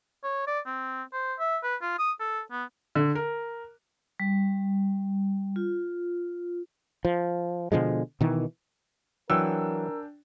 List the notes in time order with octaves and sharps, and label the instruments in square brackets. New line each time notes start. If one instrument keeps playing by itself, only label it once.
[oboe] C#5
D5
C4
C5
E5
B4
F4
D#6
A4
B3
[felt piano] D3
A#4
[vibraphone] G3
F4
[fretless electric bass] F3
B2 D3 F3 G#3
B2 D#3 E3
[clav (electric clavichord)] E3 F#3 [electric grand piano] D4 G5 G#5 [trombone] A#4 [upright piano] E6